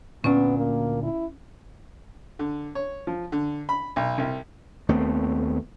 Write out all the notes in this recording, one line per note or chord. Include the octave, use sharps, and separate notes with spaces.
D2 A#2 B3 C#4 D4
A#3
E4
D3
C#5
F3
D3
B5
B1
C2
D#2 A3 B3 C4